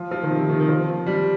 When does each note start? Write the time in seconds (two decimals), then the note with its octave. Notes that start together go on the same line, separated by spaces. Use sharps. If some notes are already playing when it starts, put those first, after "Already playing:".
Already playing: F3
0.11 F3
0.23 D#3
0.30 C3
0.41 C3
0.49 D#3
0.60 D#3
0.69 F3
1.06 G3